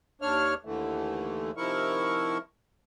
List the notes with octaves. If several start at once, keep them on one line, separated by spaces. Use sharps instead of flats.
D#2 D4 C#5 F6
D#2 D3 E3 A3
C3 D#3 F3 E4 A#4 C#6